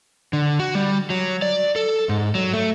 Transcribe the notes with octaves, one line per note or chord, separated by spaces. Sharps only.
D3
F#4
G3
F#3
D5
A4
G#2
F#3
A3